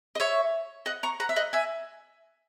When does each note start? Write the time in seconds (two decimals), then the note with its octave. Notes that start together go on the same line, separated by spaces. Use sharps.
0.15 D#5
0.20 C#5 E5
0.86 D#5 F#5
1.03 A#5 C#6
1.20 F#5 A#5
1.29 E5
1.36 D#5 F#5
1.53 E5 G#5